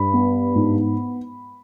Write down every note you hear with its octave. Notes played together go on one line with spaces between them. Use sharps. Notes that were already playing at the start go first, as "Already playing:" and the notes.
Already playing: G2 B5
B3
G#2